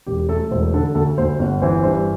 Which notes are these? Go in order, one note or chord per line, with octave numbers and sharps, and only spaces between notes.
E1 G4
A3 A4
E1 C5
D3 A4
D2 A4
D2 C5
G1
E3 C5
G2 C5